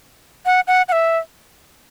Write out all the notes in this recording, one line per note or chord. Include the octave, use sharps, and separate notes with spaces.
F#5
F#5
F#5
E5